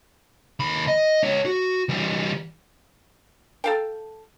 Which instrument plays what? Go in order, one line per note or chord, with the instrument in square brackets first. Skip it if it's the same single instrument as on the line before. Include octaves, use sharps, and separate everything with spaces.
[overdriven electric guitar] D#2 B5
D#5
G#3 C#5
F#4
E3 G3
[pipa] A4 F5 G5